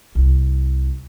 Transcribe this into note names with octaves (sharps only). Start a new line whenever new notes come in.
C2